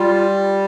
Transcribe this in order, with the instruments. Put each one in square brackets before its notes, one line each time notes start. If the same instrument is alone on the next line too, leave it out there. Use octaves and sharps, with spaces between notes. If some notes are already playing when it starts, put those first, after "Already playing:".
Already playing: [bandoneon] G3 [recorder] F4